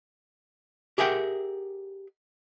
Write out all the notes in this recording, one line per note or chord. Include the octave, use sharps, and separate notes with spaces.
G4 G#4 A#4 E5 F#5 G5